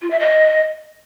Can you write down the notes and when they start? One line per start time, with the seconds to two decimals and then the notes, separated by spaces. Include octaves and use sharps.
0.02 F4
0.11 E5
0.19 D#5